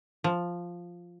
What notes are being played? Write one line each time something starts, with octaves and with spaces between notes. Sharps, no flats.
F3